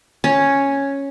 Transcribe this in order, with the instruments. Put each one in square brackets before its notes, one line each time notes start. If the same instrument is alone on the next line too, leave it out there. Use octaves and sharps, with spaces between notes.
[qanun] C#4